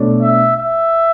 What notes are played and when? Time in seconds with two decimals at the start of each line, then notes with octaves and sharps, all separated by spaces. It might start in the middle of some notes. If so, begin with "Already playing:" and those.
Already playing: B2 A3 D4 A4 C#5
0.22 E5
0.57 E5